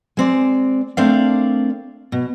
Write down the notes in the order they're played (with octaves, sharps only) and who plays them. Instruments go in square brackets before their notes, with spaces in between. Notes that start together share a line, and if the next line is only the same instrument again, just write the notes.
[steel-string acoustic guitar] G#3 C4 D5
A3 C4 D4 A#4 D5 F5
B2